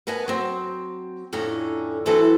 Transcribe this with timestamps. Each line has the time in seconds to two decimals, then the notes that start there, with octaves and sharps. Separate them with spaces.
0.07 B3 A#4 B4 G#5 A5
0.28 F#3 C4
1.33 F2 A2 D3 C#4 A#5
2.06 D3 E3 F#3 C4 A4 B4